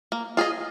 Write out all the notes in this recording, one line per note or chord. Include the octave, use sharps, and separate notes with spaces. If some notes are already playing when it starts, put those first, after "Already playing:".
A#3
F4 G#4 D#5